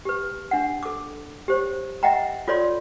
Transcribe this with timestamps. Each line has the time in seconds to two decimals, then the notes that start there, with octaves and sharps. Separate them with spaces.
0.05 G4 B4
0.51 D4 F#5
0.83 A4 D6
1.48 G4 C5 C#5
2.03 D#5 E5 F#5 G5 A#5
2.48 F4 A4 C#5 D5 C6